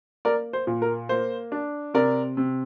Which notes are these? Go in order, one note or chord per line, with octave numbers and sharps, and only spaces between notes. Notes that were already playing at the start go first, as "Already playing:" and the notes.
A#3 A#4 D5
C5
A#2
A#4
A#3 C5
D4
C3 A#4 D5
C3